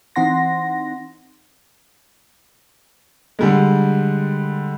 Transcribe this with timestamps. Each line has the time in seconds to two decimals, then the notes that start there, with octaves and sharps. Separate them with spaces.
0.16 E3 C4 D#4 F#5 C6 A#6
3.39 D3 G3 G#3